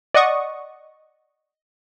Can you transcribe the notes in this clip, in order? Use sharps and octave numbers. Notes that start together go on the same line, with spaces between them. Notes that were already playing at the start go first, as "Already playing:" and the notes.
D5 D#5 F#5 C#6 D#6